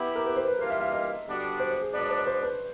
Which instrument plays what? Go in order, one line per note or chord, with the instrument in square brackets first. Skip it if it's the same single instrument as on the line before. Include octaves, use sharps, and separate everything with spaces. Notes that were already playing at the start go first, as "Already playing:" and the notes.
Already playing: [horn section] B3 E4 G4
[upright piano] A#4
B4
C5
B4
[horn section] E3 G3 A#3 D4 F4 [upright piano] A#4
[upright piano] E5
E5
D#5
[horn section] D3 G3 B3 D4 F#4
[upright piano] C5
C5
G#4
[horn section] B2 G#3 B3 D4 [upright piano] D5
[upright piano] C#5
C5
D5
C5
B4